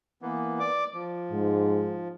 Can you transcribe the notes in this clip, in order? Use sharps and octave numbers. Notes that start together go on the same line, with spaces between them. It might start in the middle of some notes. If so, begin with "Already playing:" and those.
E3 A#3 B3
D5 D6
F3
G#2